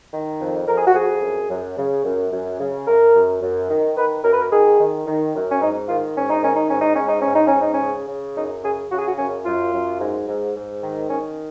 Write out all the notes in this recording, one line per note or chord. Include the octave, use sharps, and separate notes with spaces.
D#3
F2
F2 A#4
G#4
F#4
F2 G#4
F#2
F#2
C#3
F#2
F#2
C#3
F#2 A#4
F#2
F#2
D#3
D#3 B4
F#2 A#4
B4
A#4
D#3 G#4
D#3
D#3
F#2
C#4
G#2 D#4
D#3 F4
G#2 C#4
D#4
D#3 C#4
D#4
G#2 C#4
D#4
G#2 C#4
D#4
G#2 C#4
D#4
C#4
G#2
D#4
C#4
C#3
C#3
F#2 D#4
C#3 G#4
C#3 F#4
G#4
F#4
F#2 C#4
F#2 F4
F#2
G#2
G#2
G#2
D#3
D#3 C#4